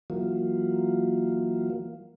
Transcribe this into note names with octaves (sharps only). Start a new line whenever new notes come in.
E3 F#3 A#3 F4